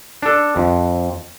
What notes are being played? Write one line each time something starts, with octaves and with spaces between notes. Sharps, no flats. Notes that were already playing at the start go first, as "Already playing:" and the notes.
D4 A4
F2